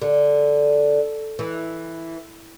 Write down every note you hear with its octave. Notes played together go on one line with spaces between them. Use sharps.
D3
E3